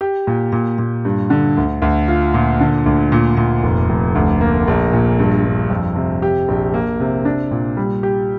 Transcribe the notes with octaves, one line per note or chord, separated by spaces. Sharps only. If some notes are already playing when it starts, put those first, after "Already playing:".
G4
A#2
A#2
A#2
G2
D3
D2
D2
F4
A#2
D3
D2
A#2
A#2
F1
F1
D2
A#3
A#1
A#2
G2
G2
F2
C3
G4
A#1
A#3
C3
D4
A#2
G3
G4